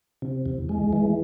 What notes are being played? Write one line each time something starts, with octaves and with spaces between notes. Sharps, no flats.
C3
E2
G#3
E3